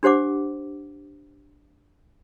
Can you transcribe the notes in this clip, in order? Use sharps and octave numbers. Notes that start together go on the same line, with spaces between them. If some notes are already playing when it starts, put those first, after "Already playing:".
D4 G4 C5 F#5 D6